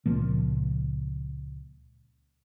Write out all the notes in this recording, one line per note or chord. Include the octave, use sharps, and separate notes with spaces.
C#2 A#2 F3 A#3